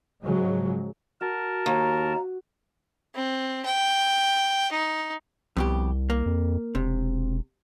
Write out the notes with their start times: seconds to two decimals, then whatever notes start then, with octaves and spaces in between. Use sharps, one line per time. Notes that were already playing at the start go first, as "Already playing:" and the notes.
0.23 G#2 C#3 F3 F#3 G#3
1.21 F#4 A#4 A5
1.66 D#2 A#5
3.15 C4
3.65 G5
4.72 D#4
5.57 C2 F2 B2 G4
6.10 A#3
6.26 F2
6.75 E1 C3